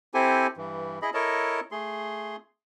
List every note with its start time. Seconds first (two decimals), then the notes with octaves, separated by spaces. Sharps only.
0.14 C4 E4 G4 A4 C5 G#5
0.57 G2 E3
1.02 E4 G#4 D#5 B5
1.14 E4 A4 A#4 C#5 D#5 A5
1.72 A3 G#4 C6